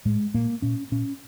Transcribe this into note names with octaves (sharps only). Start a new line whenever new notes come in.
A2 G#3
A#2 A#3
A#2 C#4
A#2 C#4